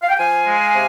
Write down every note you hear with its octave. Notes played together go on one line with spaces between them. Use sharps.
F5
G5
F3 F5 G#5
G#3
C3